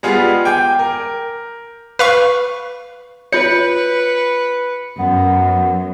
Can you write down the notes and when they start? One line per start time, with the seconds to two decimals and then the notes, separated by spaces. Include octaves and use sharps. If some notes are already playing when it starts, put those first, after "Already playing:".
0.03 G3 G#3 B3 F4 G#4
0.45 G5 G#5 D6 G6
0.79 A#4
1.99 B4 F5 C#6
3.32 F4 B4 C#5 C#7
4.99 F#2 B3